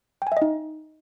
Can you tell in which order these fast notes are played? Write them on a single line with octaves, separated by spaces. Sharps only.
G5 G#5 E5 D#5 D#4